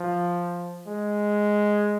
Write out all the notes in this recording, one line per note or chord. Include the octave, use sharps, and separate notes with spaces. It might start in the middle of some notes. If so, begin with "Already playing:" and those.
Already playing: F3
G#3